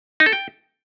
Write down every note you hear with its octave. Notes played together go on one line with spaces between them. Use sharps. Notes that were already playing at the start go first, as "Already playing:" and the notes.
D#4
A4
G5